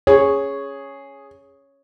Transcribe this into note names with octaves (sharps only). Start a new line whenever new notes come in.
G#4 C#5